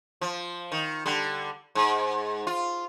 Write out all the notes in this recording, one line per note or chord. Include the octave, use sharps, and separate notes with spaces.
F3
D#3
D3 G3
G#2
F4